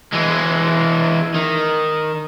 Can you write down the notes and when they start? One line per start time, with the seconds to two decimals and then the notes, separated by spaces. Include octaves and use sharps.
0.13 E3 G#3
1.34 D#3